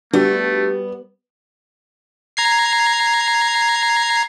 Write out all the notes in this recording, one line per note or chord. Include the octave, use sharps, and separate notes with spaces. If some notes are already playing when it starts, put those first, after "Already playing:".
G3 A3 B3 D4 F#4 G4
A#5 G#6 C7